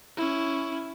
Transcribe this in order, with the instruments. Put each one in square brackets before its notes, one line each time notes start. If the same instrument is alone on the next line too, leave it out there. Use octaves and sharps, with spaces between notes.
[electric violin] C#4 E4